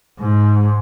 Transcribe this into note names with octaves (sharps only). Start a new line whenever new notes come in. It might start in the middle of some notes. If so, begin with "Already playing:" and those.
G#2